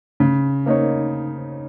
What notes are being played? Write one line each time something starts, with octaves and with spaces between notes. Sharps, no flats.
C#3
A#3 D#4 A#4 C#5